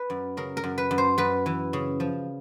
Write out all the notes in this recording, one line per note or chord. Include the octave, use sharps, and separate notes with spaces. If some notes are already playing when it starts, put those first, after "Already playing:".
Already playing: B4
F#2
C#3 A#4
A#4
F#2
B4
F#2
C5
F#2 B4
E3
C#3
F3